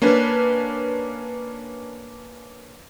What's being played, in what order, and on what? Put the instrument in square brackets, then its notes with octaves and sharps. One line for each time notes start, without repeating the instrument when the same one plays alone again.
[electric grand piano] A#3 C#4 D4 B4